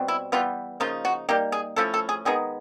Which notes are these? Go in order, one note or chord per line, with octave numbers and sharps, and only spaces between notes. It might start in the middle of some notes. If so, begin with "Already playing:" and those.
Already playing: B2 G3 C4
E4
E3 G3 B3 F4
C#3 F3 A#3 D#4 F4
F#4
G3 A#3 D#4 G4
G#4
F3 A3 C#4 E4 A4
A4
G#4
D#3 G#3 B3 D#4 G#4